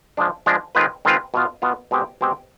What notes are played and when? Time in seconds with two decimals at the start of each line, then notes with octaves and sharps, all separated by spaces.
0.17 F3 G#3 D4
0.46 F3 G#3 D4
0.75 D#3 G#3 C4 F4 B4
1.05 D#3 G#3 C4 F4 B4
1.34 B2 B3 F4
1.62 B2 B3 F4
1.91 B2 G#3 C4 G4
2.21 B2 G#3 C4 G4